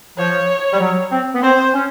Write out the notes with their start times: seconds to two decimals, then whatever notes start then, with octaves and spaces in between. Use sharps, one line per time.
0.18 F3 C#5
0.73 G3
0.80 F#3
1.11 C4
1.35 B3
1.43 C4 C5
1.74 C#4